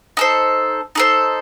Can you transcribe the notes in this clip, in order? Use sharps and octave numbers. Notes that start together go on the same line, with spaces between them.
D#4 A4 C5
D#4 A4 C5